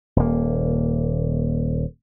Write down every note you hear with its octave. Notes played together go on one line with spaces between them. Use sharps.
D#1 A#3